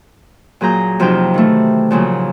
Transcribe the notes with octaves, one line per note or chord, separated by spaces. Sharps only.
A#2 F#3 G#4 A#5 G6
F2 C3 F3 F#3 D#4 G5
D#3 E3 A3
A#2 C#3 F3 F#3